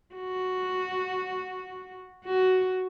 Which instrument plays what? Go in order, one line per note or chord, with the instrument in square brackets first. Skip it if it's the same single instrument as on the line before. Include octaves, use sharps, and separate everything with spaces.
[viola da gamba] F#4
F#4